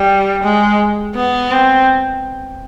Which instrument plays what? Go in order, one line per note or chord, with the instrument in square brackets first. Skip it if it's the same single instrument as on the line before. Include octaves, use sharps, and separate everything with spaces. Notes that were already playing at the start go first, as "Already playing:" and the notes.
Already playing: [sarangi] G3
G#3
B3
C4